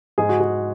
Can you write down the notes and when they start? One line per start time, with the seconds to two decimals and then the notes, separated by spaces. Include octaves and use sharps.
0.18 G#2 G#4
0.29 F#4
0.40 G#4